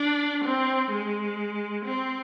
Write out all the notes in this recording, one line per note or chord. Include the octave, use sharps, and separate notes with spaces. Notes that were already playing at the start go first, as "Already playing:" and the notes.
Already playing: D4
C4
G#3
C4